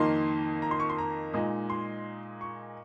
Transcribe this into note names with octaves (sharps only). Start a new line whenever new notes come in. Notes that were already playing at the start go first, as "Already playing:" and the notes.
Already playing: F2 D#3 A#3 D#4 C6
A#5
C6
C#6
C6
A#5
A#2 G#3 D#4
C6
C#6